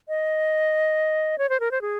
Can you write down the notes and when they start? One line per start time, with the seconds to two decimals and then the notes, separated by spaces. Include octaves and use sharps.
0.08 D#5
1.38 C#5
1.49 C5
1.60 A#4
1.71 C5
1.82 G#4